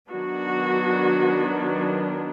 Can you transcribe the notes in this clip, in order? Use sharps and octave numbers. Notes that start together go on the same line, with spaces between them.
D#3 F#3 B3 D4 F#4